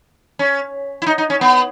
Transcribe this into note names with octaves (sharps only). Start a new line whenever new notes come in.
C#4
E4
D#4
D#4
C#4
B3